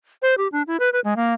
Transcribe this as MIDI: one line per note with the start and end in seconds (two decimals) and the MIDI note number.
0.22 0.34 72
0.38 0.48 67
0.52 0.62 62
0.67 0.77 64
0.80 0.89 71
0.93 1.00 71
1.04 1.14 56
1.16 1.34 58